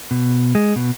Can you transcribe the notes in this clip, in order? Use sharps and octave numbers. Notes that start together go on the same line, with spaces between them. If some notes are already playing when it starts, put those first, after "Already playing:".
B2
G#3
B2